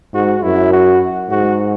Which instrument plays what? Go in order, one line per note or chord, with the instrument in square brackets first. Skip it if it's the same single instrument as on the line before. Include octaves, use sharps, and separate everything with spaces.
[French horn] G#2 [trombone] F#4
[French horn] F#2 [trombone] E4
[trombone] F#4
[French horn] G#2 [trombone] F#4